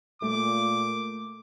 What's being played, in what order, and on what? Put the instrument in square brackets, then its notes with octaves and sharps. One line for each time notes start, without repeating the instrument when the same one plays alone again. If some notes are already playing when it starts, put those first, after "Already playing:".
[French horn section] A#2 [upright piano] A3 [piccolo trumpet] D6